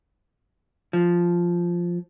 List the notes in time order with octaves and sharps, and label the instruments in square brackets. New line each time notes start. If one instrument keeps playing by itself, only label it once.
[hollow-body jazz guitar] F3